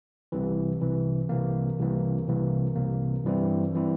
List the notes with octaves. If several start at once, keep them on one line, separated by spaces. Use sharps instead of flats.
C2 C3 E3
C2 C3 E3
C2 C3 E3 A#3
C2 C3 E3 A#3
C2 C3 E3 A#3
C2 C3 E3 A#3
G2 E3 G3 C4 E4
E3 G3 C4 E4